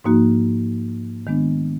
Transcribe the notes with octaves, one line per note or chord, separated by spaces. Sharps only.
G#2 F3 A#3 D#4 F#4
D#3 G#3 B3 D4